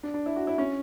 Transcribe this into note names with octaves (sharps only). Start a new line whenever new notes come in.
D4
D4
E4
F#4
E4
C#4